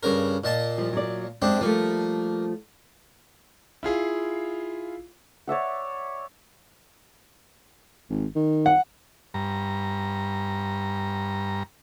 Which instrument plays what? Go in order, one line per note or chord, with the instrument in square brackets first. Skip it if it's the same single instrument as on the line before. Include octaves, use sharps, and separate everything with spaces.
[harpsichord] G2 C#3 A#4
A#2 D#5 A5
[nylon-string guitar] F3 G3
F#3 D5
[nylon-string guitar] F#2 G#3 [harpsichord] C4 D4 G4
[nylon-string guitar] F3 G3 A3 [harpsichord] A#3
[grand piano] E4 F4 G#4 F5
[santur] C#5 D5 E5 F#5
[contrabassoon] G#1
D#3
[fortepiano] F#5
[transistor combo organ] G2 A#5